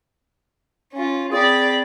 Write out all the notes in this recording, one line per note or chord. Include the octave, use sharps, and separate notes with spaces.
C#4 F4
C4 G#4 D5 B5